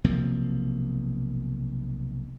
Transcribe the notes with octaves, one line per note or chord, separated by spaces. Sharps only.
B1 C3 F3 A#3